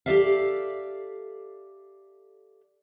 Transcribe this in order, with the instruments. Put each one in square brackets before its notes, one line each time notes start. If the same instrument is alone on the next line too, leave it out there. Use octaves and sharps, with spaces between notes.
[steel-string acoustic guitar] G4 A4 A#4 D5 E5 F5